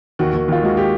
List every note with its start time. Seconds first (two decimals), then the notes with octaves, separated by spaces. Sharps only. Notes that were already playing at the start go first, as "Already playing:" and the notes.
0.19 D#2 F#4
0.34 D#2
0.48 D#2 F4
0.63 G#3 F#4
0.77 G4